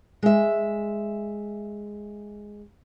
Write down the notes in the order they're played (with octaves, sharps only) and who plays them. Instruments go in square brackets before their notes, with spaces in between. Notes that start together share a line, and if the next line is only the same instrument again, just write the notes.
[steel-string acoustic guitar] G#3 E5